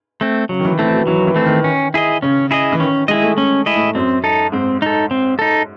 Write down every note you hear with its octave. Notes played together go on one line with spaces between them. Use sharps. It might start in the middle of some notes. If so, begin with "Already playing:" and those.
A3 C4
C#3 F#3
D#3
E3
E3 A3 C4
F#3
E3 F#3
D#3
E3
A3 C4
D#3
C#4
E4 G#4 D#5
C#3 C#4
E4 G#4 D#5
E3
D#3 C#4
G#3 E4 G#4 D#5
A3
A3 C#4
E4 G#4 D#5
A2
F#2 C4
D#4 A4
G#2 C4
D#4 A4
C4
D#4 A4